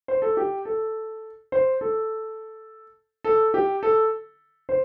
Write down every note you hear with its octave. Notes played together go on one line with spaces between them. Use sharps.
C5
A4
G4
A4
C5
A4
A4
G4
A4
C5